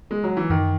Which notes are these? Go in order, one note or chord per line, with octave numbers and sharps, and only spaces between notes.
G#3
F#3
E3
F#2 D#3